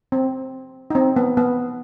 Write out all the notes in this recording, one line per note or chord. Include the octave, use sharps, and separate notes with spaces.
C4
D#4
C4
B3
B3